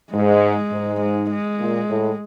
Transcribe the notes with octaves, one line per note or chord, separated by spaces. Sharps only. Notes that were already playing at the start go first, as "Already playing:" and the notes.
G#2 G#3
G#2
G#3
G#3
A#2
A2